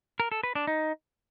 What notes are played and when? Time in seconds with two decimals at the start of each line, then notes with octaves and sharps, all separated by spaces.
0.20 A#4
0.32 A4
0.43 B4
0.55 D4
0.67 D#4